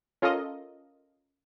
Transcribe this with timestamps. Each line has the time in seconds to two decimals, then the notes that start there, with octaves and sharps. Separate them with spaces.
0.22 C#4 F4 A4 A#4 D#5